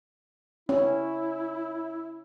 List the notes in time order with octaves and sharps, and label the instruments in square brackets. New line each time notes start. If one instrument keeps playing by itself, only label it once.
[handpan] C#4 [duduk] E4